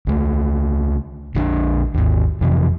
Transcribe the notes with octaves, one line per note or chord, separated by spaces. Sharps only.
C#2 A3
A#1 D3 F3 D4
G#1 D#2
F2 C3 E3